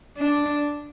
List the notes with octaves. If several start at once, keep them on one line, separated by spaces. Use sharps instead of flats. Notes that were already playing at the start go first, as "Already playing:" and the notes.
D4